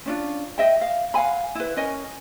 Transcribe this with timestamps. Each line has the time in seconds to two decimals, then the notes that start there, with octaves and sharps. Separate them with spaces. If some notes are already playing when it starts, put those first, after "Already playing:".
0.06 C#4 D4 F4
0.58 D#5 E5 G5
0.81 F5
1.14 F5 F#5 G#5 B5
1.55 E4 B4
1.77 C#4 A#4 D#5 G#5